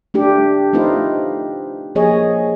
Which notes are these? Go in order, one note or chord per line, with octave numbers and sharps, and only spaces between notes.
A3 D4 G4
A3 C4 D#4 F4 B4
F3 A#3 G#4 C#5 D#5